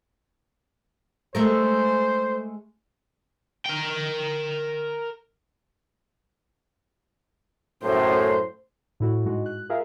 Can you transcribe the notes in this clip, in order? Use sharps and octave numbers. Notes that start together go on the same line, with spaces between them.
G#3 A3 A#4 C5
A#4 G5
F#2 A2 C5
A2 E4 F#4
G#2 G#3 F#4
F#6
F4 G#4 A#4 E5 F5